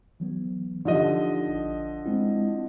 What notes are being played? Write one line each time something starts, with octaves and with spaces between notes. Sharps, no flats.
E3 F#3 B3
D3 F3 D#4 G4 D#5
A1
G#3 C4 E4